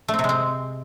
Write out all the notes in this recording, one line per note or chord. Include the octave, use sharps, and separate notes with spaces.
A3
C4
C3
G#3
C4